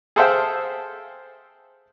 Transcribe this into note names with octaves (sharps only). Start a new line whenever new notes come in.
G#4 A4 C5 E5 F5 G5